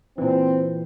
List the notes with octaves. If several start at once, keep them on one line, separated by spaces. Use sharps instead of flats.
A#2 E3 C4